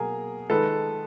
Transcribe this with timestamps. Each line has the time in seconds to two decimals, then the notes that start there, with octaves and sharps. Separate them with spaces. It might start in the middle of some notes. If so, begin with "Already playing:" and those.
Already playing: B2 F#3 A#3 G#4 A#4
0.50 D#3 G#3 A4 B4